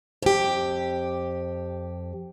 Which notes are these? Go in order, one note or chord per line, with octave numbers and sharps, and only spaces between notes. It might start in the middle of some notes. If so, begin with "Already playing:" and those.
F2 G4